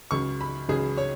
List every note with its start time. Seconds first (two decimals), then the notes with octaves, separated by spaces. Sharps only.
0.11 C#2 C#3 F#3 C#6
0.41 B5
0.69 C#2 C#3 F#3 G#4
0.97 C#5